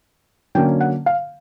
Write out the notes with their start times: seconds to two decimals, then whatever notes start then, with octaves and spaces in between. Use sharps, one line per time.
0.55 D3 F#3 A#3 C#4 G5
0.81 F#5
1.06 F5